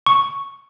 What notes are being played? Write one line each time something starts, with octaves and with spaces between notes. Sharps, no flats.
C#6